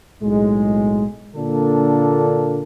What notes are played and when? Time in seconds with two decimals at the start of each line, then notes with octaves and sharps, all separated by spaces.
0.22 B1 A2 G#3
1.35 A#2 D3 A#3 D4 A4